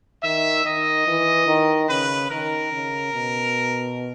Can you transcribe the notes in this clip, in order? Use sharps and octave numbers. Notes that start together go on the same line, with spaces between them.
D#3 E5
D#3 D#5
E3
D#3
C#3 B4
D#3 A#4
C#3
B2